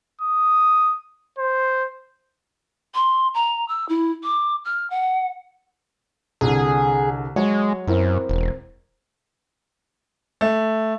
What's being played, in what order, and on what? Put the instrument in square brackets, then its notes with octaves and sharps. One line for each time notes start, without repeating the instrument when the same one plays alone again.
[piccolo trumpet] D#6
C5
[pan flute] C6
A#5
E6
E4
D6
F6
F#5
[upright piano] C2 D3 [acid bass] G#4
[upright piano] F#3 C#5 [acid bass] G#3
[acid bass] F#2 [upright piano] C4 E4 A#4
[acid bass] E1
[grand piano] A3